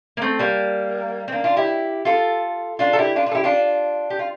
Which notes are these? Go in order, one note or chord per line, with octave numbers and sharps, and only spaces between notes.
A#3
A3 C4
G3 A#3
C4
A#3 D4
D4 F4
E4 G4
F4 A4
D4 F4
A4
E4 G4
D4 F4
D4 F4
A4
E4 G4
D4 F4
G4
F4